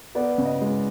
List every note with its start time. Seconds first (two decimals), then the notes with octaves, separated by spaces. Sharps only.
0.15 B3 D5
0.38 C#3
0.45 D#5
0.61 G#3